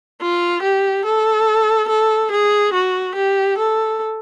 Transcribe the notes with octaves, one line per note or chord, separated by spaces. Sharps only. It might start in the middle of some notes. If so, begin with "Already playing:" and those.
F4
G4
A4
A4
G#4
F#4
G4
A4